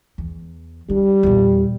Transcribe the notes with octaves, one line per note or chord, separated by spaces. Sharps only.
E2
G3 D4
E2 A#2